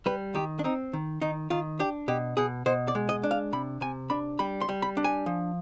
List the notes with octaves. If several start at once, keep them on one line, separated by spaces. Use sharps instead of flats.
G3 B4
D#3 G4
D4
C4 D#4
D#3
D#3 D#4
D#3 F4
D4 G4
B2 G4
B2 G#4
B2 C5
D5
G#3
D#5
D4
F5
C3 B5
C3 G#5
D4 B5
G3 B5
C6
G3
B5
D4
G#5
F3